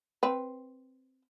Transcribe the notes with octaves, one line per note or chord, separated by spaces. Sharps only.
C4 B4